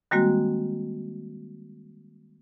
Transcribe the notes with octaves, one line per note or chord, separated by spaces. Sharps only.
D#3 G3 G#3 A#3 C4 F#4